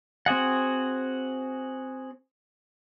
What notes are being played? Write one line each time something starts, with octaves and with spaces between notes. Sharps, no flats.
C4 F#4 G#4 F#5